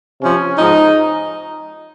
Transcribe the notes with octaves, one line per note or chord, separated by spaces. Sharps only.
C3 F3 C#4
G#2 F3 D#4